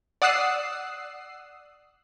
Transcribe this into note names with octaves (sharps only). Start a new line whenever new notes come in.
D5 F#5 D#6 E6 F#6 C7